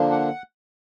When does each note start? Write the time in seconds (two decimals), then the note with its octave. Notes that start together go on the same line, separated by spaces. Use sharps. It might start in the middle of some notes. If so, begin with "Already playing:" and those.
Already playing: D3 F3 A#3 D4
0.11 F#5